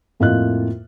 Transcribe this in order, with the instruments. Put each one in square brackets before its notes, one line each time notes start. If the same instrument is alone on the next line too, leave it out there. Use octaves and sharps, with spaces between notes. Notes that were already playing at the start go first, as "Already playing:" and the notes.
[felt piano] F2 A2 A#3 F4 D#5 F#6